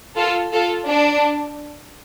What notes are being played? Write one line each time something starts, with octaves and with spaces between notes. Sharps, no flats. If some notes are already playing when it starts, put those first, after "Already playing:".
F4 A4
F4 A4
D4